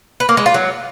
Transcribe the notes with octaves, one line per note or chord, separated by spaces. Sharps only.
B4
A#3
G#3
F4
F#3